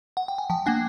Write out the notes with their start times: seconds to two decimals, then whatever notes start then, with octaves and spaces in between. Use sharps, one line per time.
0.17 F#5
0.28 G5
0.38 G#5
0.50 F3 G5 A5
0.66 A#3 D4 F#5 G#5